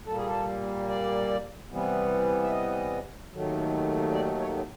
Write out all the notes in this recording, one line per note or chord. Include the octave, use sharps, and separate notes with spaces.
A#2 G3 A#3 A4
G#4
A4
D5
C3 E3 G3 B3
E5
D#5
D#2 D#3 F#3 A3
D5
C#5